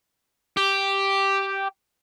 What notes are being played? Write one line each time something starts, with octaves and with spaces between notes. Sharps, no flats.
G4